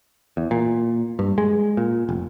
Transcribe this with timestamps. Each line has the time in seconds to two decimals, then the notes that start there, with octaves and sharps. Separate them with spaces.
0.37 E2
0.51 A#2
1.19 G2
1.38 G#3
1.77 A#2
2.09 F1